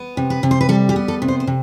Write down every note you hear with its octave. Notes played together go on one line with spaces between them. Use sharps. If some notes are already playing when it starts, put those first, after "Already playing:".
Already playing: B3
C3
B4
C3
C5
B4
G3 A4
G4
B3
A4
C3
C5
C5
C3